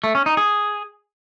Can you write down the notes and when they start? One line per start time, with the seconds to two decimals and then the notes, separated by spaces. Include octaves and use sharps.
0.04 A3
0.15 C#4
0.26 D#4
0.37 G#4